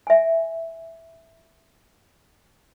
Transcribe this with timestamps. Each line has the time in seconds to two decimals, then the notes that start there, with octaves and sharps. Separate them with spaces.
0.07 E5 G#5